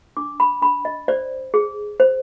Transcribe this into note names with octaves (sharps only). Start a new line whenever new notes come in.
D4 D6
B5
D4 B5
D#5
C5 D5
G#4
C5